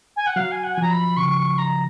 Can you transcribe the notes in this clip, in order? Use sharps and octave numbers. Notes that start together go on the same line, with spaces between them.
G#5
F#5
F#3 F5
G#5
F#5
G#5
F3 A#5
B5
C#3 C#6
C#6
A#5